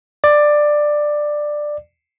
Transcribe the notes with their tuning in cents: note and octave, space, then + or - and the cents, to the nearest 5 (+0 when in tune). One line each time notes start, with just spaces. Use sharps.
D5 +15